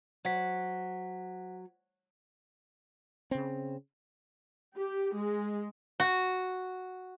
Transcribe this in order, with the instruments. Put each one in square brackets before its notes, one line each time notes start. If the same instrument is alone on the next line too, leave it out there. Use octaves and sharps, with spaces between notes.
[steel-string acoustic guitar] F#3 [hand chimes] C5 F#5 B6
[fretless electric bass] C#3 C4
[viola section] G4
G#3
[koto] F#4